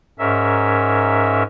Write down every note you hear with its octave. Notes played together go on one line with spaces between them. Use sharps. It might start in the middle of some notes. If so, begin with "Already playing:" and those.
G#2 C#4 A#4 E5